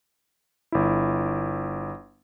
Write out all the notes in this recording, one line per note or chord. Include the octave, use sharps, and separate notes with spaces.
G1 E4